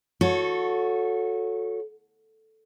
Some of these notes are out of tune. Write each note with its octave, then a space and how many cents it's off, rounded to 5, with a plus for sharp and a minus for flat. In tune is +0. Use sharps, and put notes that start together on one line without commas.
F#4 -25 A4 +0 C#5 +0